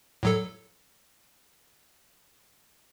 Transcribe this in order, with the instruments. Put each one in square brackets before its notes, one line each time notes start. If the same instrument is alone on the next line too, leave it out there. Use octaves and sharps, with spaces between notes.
[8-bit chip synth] A2 F#3 A4